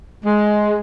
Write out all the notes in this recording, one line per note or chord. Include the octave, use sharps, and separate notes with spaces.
G#3